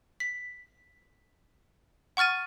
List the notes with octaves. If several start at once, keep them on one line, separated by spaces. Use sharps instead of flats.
B6
F#5 C#6 F6 A6 D#7